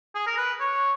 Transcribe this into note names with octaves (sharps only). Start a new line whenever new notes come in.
G#4
A#4
B4
C#5